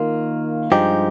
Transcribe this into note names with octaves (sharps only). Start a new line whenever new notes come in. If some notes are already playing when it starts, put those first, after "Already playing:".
Already playing: D#3 A#3 F4
G2 F3 G#3 D#4 G4